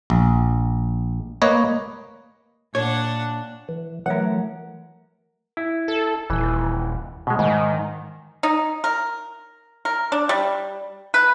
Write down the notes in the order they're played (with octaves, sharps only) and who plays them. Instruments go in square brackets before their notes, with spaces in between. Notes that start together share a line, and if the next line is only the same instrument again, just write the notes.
[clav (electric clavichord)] A#1
A#3 B4 C#5 D#5
[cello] A#2 [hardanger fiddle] D4 F#5 [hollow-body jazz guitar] C#5
[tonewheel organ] E3
[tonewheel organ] E3 F#3 A3 [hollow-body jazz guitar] A#4 F#5
[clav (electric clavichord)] E4
[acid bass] A4
[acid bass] D#1 [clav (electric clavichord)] E3
[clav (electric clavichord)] B2 G#3
[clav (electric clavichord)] G#2 [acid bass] D#3
[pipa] D#4
A#4
A#4
D4
G3
B4